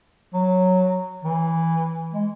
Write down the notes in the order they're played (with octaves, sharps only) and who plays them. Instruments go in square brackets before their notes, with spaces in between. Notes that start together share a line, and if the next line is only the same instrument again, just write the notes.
[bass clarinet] F#3
E3
G#3